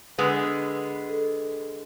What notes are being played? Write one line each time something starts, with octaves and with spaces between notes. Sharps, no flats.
D3 G#3 B3 B4
A4